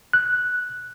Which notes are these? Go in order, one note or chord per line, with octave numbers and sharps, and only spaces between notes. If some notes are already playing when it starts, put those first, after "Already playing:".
F#6